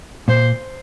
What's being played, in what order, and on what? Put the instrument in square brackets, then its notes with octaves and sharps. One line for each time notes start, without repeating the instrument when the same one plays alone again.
[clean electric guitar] A#2 [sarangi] C5